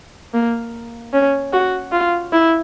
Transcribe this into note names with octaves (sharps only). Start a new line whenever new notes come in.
A#3
C#4
F#4
F4
E4